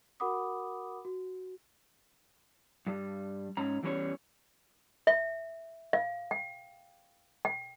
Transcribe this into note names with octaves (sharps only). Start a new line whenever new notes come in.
F#4 A#4 F#5 B5 D6 D#6
F#4
G2 G3
G#2 C#4 A#5
E2 E3 G3 C#4 D#4 C#5
E5
F5
G5
G5